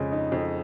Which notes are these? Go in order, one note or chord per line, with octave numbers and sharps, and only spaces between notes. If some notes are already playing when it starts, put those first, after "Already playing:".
Already playing: F2 C#3 G#3
D#4
F2